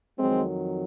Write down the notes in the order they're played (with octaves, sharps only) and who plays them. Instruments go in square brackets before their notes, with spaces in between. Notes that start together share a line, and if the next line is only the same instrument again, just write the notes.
[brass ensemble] F2 D#3 F#3 G#3 C4